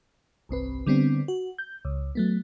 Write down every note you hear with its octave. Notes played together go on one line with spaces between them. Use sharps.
G1 C2 C4 B4
D3 G3 B3 C4 D4
F#4
G6
C#2
F#3 A3 B3